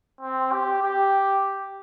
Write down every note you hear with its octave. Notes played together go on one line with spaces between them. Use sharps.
C4
G4
G4